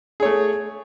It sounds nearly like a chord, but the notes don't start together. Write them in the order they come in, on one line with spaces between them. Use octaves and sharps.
G#4 C#5 A3